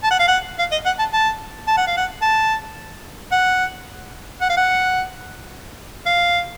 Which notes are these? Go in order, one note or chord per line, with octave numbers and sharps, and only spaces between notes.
A5
F#5
F5
F#5
F5
D#5
F#5
A5
A5
A5
F#5
F5
F#5
A5
F#5
F#5
F5
F#5
F5